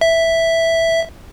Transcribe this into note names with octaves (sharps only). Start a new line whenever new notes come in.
E5